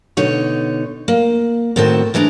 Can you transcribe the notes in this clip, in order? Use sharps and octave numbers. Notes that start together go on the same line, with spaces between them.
B2 D3 D#4 C#5
A#3
A2 D#3 C4 F#4 A5
E3 G#3 D4 A#5